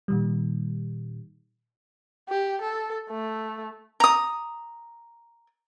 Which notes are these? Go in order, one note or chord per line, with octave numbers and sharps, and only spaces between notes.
A#2 D#3 G3
G4
A4
A3
A#5 D#6